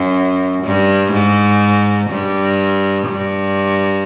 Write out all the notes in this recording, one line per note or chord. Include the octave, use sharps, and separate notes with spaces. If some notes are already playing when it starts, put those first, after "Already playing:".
Already playing: F#2
G2
G#2
G2
G2